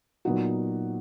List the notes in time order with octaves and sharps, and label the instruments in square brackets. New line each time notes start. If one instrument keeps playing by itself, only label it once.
[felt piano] A#2 F#3 B3 D#4 F#4